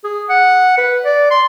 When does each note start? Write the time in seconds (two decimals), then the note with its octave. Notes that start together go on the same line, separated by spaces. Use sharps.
0.04 G#4
0.29 F#5
0.78 B4
1.05 D5
1.31 C6